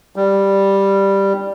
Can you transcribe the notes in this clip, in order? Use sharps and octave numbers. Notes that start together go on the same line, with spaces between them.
G3